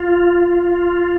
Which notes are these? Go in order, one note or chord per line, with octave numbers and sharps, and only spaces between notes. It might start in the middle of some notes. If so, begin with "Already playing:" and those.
Already playing: F4